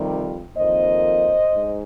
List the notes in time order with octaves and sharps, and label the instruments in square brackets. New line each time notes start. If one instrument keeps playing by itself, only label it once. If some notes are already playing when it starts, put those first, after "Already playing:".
Already playing: [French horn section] F2 C3 D#3 G3
F2 D#3 A#3 C5 D#5
G#2